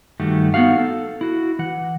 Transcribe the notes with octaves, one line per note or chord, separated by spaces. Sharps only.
G2 D#3 A3 F#4 G4
B3 C#4 D#4 F#4 F5
A4
E4 F#4
E3 F#5